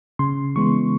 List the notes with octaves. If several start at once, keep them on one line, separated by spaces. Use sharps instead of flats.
C#3 C6
E3 G#3 B3 C#6